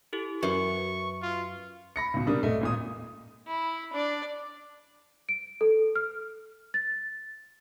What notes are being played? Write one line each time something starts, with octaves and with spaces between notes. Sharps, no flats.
E4 G4 A4
F#2 F#4 B4 E5 C#6
F4
B5 A#6 C#7
C#2 B2
C3 G3 A#3 D4 D#6
F#1 A3 D#5
G#1 A#2 D#6
E4
D4 D5
D7
A4
F6
A6